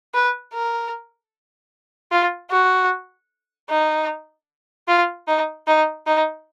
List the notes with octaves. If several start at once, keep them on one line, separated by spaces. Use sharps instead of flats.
B4
A#4
F4
F#4
D#4
F4
D#4
D#4
D#4